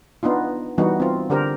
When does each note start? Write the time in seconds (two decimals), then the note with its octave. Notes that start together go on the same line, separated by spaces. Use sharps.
0.23 B3 D4 D#4 F4
0.78 E3 G3 B3 D#4 F#4
1.00 C4 F4
1.30 D3 D4 G4 A#4 C5